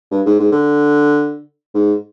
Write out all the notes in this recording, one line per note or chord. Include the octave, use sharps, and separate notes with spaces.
G2
G#2
G#2
D3
G#2